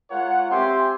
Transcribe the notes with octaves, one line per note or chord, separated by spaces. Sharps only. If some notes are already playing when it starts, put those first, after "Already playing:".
G#3 F4 A#4 C#5 F#5
C4 G4 E5 G#5 C6